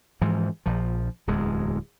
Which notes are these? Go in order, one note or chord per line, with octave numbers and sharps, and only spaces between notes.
G#2 E3 F3
A#1 F3
D1 E2 G#3